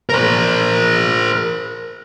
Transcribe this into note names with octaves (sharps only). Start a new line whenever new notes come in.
A#4 C5